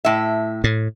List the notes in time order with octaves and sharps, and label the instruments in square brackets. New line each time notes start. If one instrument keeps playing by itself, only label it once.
[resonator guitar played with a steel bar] A2 E5
[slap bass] A2